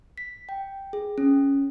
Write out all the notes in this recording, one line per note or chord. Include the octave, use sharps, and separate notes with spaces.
B6
G5
G#4
C#4